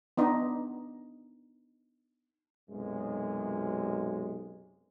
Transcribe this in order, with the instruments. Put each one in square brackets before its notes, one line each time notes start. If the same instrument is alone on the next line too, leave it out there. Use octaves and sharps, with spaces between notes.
[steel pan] B3 D4 D#4
[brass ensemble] B1 F#2 C3 G#3